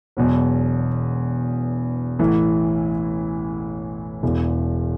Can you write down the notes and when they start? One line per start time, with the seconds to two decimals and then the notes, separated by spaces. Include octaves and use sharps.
0.17 E1 E2 B2 F#3
2.19 A1 A2 E3
4.23 E1 E2 E3